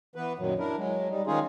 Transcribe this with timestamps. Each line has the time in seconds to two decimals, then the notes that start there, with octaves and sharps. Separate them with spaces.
0.16 E3 B3 B4
0.39 F#2 A#2 D#3 F#3
0.59 D4 E4 A#4
0.77 F#3 G#3
1.10 G3 D#4
1.27 D#3 G#3 C#4 D#4 F4 G#4